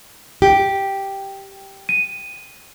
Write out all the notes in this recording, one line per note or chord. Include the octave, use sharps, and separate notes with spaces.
G4
D#7